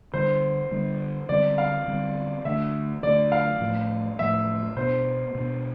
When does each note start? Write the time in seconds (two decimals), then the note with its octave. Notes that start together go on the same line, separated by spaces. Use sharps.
0.14 D3 G3 D4 C5
0.71 D3 G3 D4
1.29 D3 G3 C4 D5
1.58 F5
1.88 D3 G3 C4
2.45 D3 A3 D4 E5
3.03 D3 A3 D4 D5
3.32 F5
3.61 A2 F3 A3
4.19 A2 F3 A3 E5
4.77 B2 B3 D4 C5
5.35 B2 B3 D4